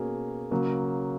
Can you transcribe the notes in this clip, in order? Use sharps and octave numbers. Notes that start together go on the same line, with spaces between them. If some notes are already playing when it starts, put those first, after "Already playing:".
Already playing: B2 A#3 C#4 G#4
C#3 F#3 A#3